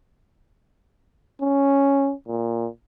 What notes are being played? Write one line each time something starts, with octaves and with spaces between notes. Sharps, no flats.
C#4
A#2